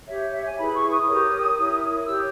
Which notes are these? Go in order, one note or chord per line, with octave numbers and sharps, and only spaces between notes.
G4 C#5 E5
E5
G#5
E4 G#4 B4 B5
C#6
D#6
G4 A#4 C#5
E4 A#4 C#5
G4 C#5 E6